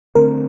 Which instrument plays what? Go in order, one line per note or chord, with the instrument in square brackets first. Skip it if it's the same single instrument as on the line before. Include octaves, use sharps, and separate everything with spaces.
[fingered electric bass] D3 A3 C4 [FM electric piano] A#4